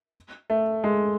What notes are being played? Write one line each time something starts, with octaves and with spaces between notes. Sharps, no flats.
A3
G#3